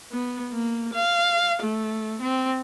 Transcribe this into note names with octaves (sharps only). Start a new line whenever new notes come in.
B3
A#3
F5
A3
C4